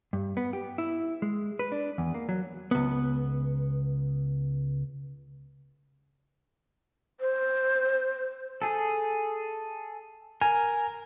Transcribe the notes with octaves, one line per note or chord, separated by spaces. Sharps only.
G2
B3
G4
E4
G#3
B4
D4
E2
A#3
F#3
C#2 B3
C5
G#4 A4
A#4 G#5